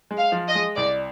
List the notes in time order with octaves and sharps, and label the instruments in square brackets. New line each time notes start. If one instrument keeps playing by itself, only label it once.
[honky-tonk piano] G#3
[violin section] F5
[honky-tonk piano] F3
[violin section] D#5
[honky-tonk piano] G#3
[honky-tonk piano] C2 [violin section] D5